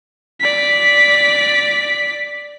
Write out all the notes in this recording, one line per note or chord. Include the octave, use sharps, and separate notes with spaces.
D5 B6